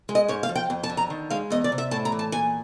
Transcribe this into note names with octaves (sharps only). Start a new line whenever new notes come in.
G#3
D#5
G#2 C#5
F5
F3
G5
F2
A5
D3
A#5
D#3
G#3 F5
E2 D#5
D5
C3
E5
A2 A5
A#5
E3
A5
A#2 G#5